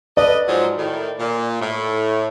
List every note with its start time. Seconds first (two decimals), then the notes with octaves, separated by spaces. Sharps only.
0.17 A4 B4 D5 D#5
0.48 G#2 F3 F#3
0.78 A2 D#3
1.19 A#2
1.61 A2